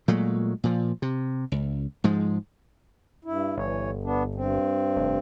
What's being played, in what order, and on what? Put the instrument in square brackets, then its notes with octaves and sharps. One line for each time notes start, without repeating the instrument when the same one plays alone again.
[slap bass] A#2 F#3 G#3 A3
A#2 F3
C3
C#2
G#2 F3 G#3
[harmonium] G2 E4
[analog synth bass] G1 [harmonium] E3 C#5
[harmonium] B3 D4
G2 C4
[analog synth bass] F1